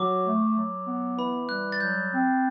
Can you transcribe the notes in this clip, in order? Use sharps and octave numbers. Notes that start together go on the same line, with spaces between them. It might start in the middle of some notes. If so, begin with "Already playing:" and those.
Already playing: F#3 D6
A3
F#3
B3
E3 B5
G3 F#6
A6
F#3 G6
C4